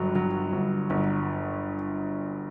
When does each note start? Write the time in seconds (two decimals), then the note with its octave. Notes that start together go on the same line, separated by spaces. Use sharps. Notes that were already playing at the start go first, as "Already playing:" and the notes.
Already playing: G1 G2 F#3
0.15 F#3
0.53 G1
0.90 G1